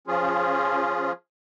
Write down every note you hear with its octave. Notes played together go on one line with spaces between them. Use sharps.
F3 C#4 F4 G#4